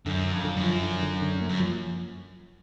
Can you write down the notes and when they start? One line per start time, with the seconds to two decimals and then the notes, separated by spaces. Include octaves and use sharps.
0.06 F#2 D3
0.24 D3
0.32 F2
0.44 D3
0.56 F#2
0.64 F3
0.83 D3
1.02 D3
1.22 D3
1.41 A#3
1.49 F#2
1.60 F3